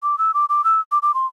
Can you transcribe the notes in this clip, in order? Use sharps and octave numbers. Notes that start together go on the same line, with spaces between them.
D6
E6
D6
D6
E6
D6
D6
C6